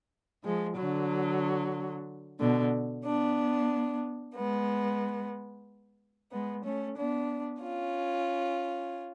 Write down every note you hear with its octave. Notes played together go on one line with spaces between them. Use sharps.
F3 G#3
D3 F#3
B2 D3
B3 D4
G#3 B3
G#3 B3
A3 C#4
B3 D4
C#4 F4